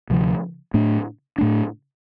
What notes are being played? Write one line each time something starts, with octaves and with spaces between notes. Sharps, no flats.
D2 C3 F3
A2 A3 D4
A2 A3 D4